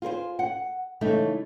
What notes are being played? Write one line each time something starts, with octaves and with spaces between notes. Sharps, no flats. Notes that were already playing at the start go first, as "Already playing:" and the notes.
F4 G#4 A#4 C5
F#5
C#3 E3 G#3 A3 D#4